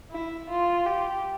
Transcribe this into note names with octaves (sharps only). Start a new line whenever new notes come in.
E4
F4
G4